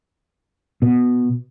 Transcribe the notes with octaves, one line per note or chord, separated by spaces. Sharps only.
B2